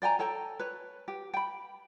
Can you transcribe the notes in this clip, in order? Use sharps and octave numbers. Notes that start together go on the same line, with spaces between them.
D5 G5 G#5 A#5
A4 C#5 G5 A#5
B4 C#5
G4
G5 B5